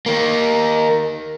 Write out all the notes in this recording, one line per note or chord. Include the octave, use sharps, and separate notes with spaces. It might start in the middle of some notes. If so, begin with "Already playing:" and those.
D#3 A#3